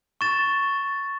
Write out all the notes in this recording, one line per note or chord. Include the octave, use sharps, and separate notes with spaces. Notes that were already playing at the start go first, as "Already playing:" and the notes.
C#6 A6 E7